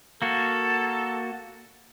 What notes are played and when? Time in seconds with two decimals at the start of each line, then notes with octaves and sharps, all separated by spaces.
0.22 A#3 F#4 A4